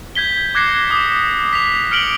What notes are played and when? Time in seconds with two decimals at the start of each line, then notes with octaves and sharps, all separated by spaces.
0.15 G6 G#6 B6 G7
0.55 D6 F#6 G#6 A#6 C7 C#7
0.90 D6 D#6
1.53 B6 F7
1.91 F6 C#7 D7 F#7 G7